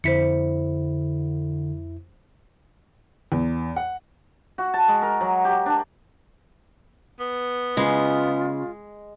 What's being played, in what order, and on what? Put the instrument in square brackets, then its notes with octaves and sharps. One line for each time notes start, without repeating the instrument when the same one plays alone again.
[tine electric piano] F2 E4 [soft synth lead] D3 [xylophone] C5 B6 C#7
[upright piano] E2
F#5
[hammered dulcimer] F#4
A5
G#3
A#4
F#3
G4
D4
[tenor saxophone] B3
[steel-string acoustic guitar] C#3 [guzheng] G#3 [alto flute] F4